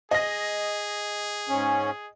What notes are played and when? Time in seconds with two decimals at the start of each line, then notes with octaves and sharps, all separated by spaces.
0.11 G#4 D#5 A#6
1.49 G#2 C#4